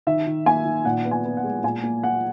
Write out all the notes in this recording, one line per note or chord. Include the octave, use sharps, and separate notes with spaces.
D#3 E5
D#3
A#3 G#5
D#3
A#2 F#5
B3
G#5
B3
F#5
G#3
A#2 G#5
A#3
A#3 F#5